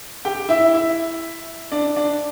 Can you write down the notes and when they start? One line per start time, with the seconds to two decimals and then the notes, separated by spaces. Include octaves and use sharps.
0.25 G4 G5
0.49 E4 E5
0.73 E4 E5
1.72 D4 D5
1.96 D4 D5